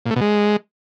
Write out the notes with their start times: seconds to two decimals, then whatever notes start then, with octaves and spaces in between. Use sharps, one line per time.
0.06 A#2
0.11 A3
0.16 B2
0.21 G#3